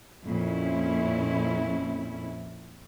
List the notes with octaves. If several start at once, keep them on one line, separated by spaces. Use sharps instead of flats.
F2 A#2 C#4 E4